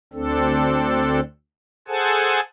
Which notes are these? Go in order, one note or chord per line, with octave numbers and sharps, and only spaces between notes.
D2 C4 D4 A4
G#4 A4 C5 F#5 G#5 A5